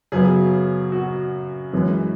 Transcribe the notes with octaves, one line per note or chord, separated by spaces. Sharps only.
F#2 C#3 F#3 B3 G#4
F#4
F#2 E3 G#3